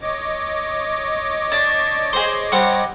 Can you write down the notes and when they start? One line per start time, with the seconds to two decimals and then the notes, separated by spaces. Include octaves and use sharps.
0.01 C#5 D#5 D6
1.52 D4
2.13 G#4 C5 C6
2.52 G3 C4 F#5